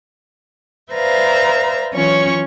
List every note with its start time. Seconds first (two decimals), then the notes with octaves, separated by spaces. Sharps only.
0.91 B4 C5 D5 E5 F5 A#5
1.92 E3 F#3 C#4 F4 C#5 C#6